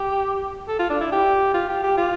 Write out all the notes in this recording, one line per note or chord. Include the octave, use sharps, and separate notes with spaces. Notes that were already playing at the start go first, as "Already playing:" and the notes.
Already playing: G4
A4
F4
D4
E4
G4
F4
G4
G4
F4